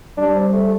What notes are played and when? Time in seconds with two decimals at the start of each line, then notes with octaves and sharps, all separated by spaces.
0.18 G3 D4
0.35 C4
0.53 A3